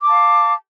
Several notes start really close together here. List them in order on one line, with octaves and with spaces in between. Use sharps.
D6 A5 F5